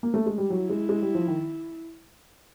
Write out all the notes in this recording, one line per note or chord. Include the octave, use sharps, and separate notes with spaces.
A#3
A3
G#3
G3
F#3 E4
G#3
G#3
G3
F3
D#3